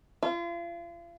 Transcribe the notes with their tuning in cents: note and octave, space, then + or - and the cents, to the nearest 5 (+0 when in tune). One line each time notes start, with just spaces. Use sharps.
F4 -40